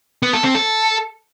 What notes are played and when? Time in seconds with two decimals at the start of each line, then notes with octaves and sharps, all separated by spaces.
0.23 B3
0.33 A4
0.44 C4
0.55 A4